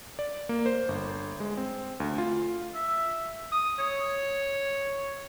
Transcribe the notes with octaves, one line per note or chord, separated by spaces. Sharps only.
D5
A#3
C5
G1
G#3
C4
D2
F4
E5
D#6
C#5